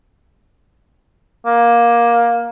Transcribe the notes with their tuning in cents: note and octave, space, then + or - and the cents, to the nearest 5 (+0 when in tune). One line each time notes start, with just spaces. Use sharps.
A#3 +15